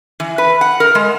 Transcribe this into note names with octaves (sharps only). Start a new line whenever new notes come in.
E3
B4
F#5
A#4
G#3